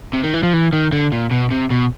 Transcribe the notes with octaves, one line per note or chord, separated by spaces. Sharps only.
C3
D#3
E3
F3
E3
D#3
D3
A#2
B2
C3
B2